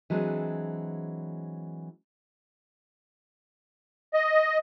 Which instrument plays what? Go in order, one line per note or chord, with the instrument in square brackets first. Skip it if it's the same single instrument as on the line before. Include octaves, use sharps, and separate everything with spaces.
[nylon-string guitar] E3 F#3 G#3 C4 D4
[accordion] D#5